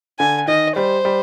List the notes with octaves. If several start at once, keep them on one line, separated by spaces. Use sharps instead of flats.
D3 G#5
D#3 D#5
G3 C5
G3